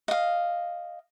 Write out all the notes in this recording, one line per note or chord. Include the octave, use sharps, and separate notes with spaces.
D#5 F5